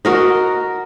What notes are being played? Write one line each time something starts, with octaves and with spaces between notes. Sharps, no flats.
F#4 A#4 D#5